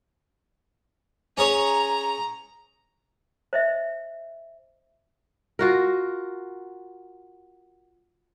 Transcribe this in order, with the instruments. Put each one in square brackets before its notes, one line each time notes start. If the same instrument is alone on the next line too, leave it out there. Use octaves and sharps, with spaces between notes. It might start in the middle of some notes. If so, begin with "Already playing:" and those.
[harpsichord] C#4 G#4 C#5 [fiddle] A#5
[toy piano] C5 D#5 E5
[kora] F4 F#4 A#4